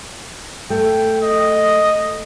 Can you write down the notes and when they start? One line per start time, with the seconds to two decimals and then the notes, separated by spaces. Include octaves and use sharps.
0.70 A3 G5
1.22 D#5